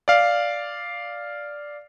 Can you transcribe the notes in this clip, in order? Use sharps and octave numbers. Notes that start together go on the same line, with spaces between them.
D5 F5